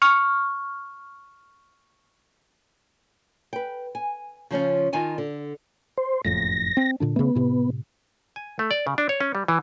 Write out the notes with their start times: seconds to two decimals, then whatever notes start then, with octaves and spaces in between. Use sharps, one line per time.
0.02 C#6 F6
3.53 B4 G5
3.95 G#5
4.51 C#3 F3 C#4 F4
4.93 D#3 D#4 F4 G#5 A5
5.18 D3
5.98 C5
6.25 F#1 F2 A2 A#6
6.77 C4
7.00 A#2 D3 D4
7.16 C#3 A3 B3
7.35 A2 C3
8.36 G#5
8.59 A3
8.71 D5
8.87 C#3
8.98 D4
9.09 C#5
9.20 C#4
9.35 G3
9.48 E3